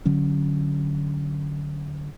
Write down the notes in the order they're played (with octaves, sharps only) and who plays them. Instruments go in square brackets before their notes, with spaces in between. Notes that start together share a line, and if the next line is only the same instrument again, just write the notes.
[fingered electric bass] D3 F#3 C#4